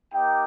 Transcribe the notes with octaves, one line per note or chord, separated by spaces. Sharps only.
A#3 D#4 G4 G5